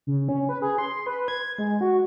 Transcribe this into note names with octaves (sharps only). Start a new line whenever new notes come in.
C#3
C#4
B4
G#4
C6
B4
G#6
G#3
F#4